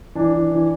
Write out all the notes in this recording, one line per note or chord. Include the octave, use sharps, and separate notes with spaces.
E3 D4
E3
E3